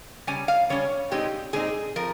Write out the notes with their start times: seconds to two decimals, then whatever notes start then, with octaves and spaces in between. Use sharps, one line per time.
0.27 C#3 G3 C#4 G#5
0.48 F5
0.69 C#3 G3 C#4 C#5
1.11 A#2 G#3 C4 D#4 G4
1.53 A#2 G#3 C4 D#4 G#4
1.96 F3 C4 A#4